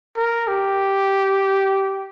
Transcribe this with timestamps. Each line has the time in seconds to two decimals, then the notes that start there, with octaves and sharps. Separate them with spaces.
0.17 A#4
0.48 G4